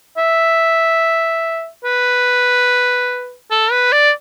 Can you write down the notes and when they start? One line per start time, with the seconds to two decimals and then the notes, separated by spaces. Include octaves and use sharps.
0.17 E5
1.84 B4
3.51 A4
3.71 B4
3.92 D5